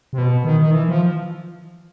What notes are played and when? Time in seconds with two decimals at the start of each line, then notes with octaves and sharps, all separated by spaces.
0.13 C3
0.18 B2
0.44 D#3
0.60 D#3
0.71 E3
0.89 F3